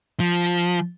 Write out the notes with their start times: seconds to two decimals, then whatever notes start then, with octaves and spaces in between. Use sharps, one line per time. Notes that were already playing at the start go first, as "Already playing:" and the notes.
0.20 F3